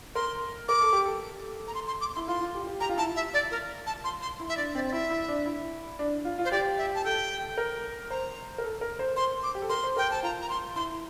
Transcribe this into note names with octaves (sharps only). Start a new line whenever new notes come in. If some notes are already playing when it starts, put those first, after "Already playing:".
A#4 C6
A#4 D6
A4
G4
A4
A#5
C6
C6
D6
E4 C6
F4 C6
F4
G4
F4
G4
G4 A#5
F4
E4 A5
F4
E5
D5
A#4
A5
C6
C6
E4
E5
D4 D5
C4 D5
D5
E4 E5
E4
D4
E4
D4
F4
F4
C5
G4 D5
E5
A5
A4 G5
A#4
C5 A#5
A#4
A4
A#4
C5
C5 C6
D6
G4
A4
A#4 C6
C5
A#4 G5
C5 A5
F4 A#5
A#5
C6
E4 C6